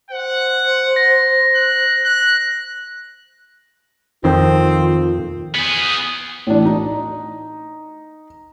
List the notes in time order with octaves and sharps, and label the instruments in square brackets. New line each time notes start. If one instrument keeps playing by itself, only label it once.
[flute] C5 [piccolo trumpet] F#5
[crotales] A#6
[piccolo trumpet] F#6
F#6
[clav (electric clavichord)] F2 C5 G5 [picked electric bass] D#3 [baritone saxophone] C4 [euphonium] F4
[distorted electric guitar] B3 G#4
[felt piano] A2 E3 D4
D#4